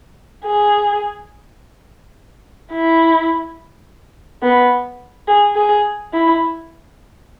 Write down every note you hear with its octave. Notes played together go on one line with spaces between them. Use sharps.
G#4
E4
B3
G#4
G#4
E4